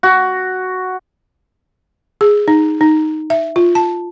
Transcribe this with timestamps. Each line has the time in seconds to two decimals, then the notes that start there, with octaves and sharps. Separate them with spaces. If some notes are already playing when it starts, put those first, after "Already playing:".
0.03 F#4
2.21 G#4
2.48 D#4
2.81 D#4
3.30 E5
3.56 F4
3.75 A5